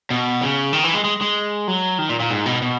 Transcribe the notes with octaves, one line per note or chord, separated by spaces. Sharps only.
B2
C#3
D#3
E3
G#3
G#3
G#3
F#3
D#3
A#2
A#2
G#2
B2
B2